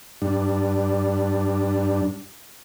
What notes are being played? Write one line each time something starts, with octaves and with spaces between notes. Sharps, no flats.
G2 D4